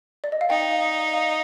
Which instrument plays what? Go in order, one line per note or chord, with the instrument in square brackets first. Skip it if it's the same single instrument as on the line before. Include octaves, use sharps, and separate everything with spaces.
[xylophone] D5
D#5
F5
[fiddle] D#4 [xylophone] G5
[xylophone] F5
F5